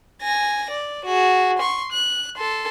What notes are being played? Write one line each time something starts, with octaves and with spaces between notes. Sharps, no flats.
G#5 A#6
D5
F#4 G#4
C6 C#6
F#6
A4 C6